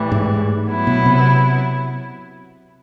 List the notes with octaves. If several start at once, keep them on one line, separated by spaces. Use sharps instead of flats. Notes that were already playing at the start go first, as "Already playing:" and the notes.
Already playing: A2 E3 G3
G#2
F#3 B3 E4
B2
C3